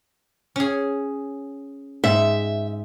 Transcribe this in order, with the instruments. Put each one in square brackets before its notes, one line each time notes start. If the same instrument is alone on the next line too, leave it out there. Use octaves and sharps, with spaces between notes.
[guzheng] C#4 G#4
[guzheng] G#2 [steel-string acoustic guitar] E5